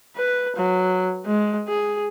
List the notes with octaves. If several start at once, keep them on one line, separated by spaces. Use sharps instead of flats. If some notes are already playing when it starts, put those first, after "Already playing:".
B4
F#3
G#3
G#4